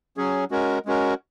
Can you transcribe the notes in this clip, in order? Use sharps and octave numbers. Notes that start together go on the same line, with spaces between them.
F#3 C#4 G#4
G#3 C#4 F#4 A#4
G#3 C#4 F#4 A#4